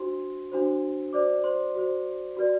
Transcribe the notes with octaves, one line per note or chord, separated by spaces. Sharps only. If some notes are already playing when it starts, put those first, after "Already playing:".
Already playing: D4 F#4 C5 C6
D4 F#4 C5
F#4 C5 D5 D6
C5 C6
F#4 C5
F#4 B4 D5